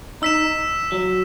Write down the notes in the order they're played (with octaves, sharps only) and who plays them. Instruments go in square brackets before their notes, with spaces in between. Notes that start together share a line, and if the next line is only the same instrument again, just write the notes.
[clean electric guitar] D#4 [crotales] E6 B6 E7
[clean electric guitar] F#3